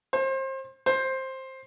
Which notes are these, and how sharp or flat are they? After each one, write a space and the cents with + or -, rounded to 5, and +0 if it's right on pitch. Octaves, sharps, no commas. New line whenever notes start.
C5 +30
C5 +10